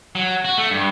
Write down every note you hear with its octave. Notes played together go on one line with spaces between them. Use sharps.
F#3
F#4
A3
G2